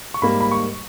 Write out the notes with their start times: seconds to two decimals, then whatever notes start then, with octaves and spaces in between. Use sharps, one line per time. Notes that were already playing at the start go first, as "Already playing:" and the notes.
0.14 C#6
0.22 G#2 G3 A#3 B5
0.40 B5
0.52 C#6